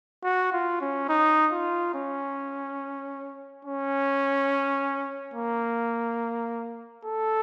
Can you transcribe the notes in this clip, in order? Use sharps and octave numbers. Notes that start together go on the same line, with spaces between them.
F#4
F4
C#4
D#4
F4
C#4
C#4
A#3
A4